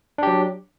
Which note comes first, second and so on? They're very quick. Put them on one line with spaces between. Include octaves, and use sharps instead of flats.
D4 G4 F#3